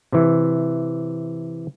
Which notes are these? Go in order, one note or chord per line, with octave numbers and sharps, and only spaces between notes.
C3 E3